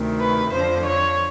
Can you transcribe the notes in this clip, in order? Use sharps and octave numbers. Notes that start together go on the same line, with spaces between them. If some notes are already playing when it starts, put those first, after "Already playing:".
Already playing: D2 C3 D#3
B4
F2 D3 F3 C5
C#5